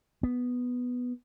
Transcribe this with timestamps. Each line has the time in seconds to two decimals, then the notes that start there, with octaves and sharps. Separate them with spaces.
0.23 B3